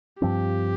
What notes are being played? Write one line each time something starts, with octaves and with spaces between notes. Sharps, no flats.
G2 F3 C4 G4